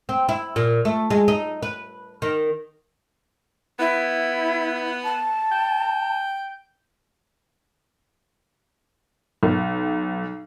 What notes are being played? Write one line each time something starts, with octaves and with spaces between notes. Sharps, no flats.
C4
E4
A#2
A3
G#3
D#4
B4
D#3
B3 E4
A5
G5
B1